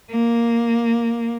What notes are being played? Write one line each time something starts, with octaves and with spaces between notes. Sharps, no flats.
A#3